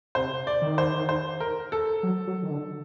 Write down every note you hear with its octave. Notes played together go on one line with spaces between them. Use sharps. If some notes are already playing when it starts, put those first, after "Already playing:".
C3 C5
D5
D#3
C5
C5
A#4
A4
F#3
F#3
D#3
D3